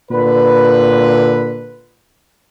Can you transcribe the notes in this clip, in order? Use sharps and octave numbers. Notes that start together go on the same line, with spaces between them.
A#2 D3 B4